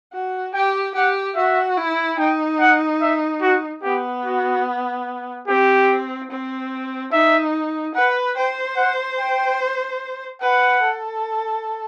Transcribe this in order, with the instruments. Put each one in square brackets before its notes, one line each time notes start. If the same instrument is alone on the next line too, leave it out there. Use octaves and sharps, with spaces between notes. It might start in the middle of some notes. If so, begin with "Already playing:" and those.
[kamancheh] F#4
[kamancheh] G4 [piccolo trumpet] G5
[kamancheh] G4 [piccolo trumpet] F#5
[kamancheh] F#4 [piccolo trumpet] E5
[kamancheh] E4
[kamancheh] D#4 [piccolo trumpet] G5
[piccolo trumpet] F#5
E5
F#4
[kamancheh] B3 [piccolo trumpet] G4
[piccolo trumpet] F#4
[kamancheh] C4 [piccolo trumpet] G4
[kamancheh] C4
[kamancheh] D#4 [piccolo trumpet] E5
[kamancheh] B4 [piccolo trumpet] F#5
[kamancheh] C5 [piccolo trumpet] G5
[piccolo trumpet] F#5
G5
[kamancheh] B4 [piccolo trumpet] F#5
[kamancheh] A4